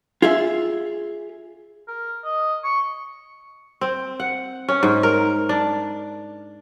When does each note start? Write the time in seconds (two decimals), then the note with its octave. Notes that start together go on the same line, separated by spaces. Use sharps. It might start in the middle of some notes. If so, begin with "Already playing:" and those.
0.22 F4 G#4 E5
1.88 A#4
2.24 D#5
2.64 C#6
3.81 C4
4.20 F#5
4.69 C#4
4.83 G#2
5.03 A#4
5.49 D4